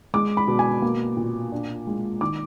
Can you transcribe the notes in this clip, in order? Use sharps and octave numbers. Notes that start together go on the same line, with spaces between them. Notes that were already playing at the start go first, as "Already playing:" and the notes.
G#3 D6
B5
B2
G#5
A#3
A#2
D4
G#3
D#3 D6